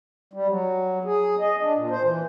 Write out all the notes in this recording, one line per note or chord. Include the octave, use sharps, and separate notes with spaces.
G3
F#3
G#4
D#5
D4
A#2
C5
E3